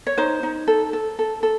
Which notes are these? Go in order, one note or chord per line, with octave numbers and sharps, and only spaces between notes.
C#5
D#4 C5
D#4
A4
A4
A4
A4